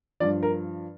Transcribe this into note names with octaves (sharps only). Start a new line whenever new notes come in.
G2 F3 D5
A#4